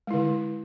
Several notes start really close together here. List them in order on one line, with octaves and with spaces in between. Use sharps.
G#3 E4 D3